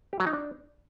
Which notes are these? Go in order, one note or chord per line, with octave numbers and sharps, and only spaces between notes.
G4
F#3
D#4
D4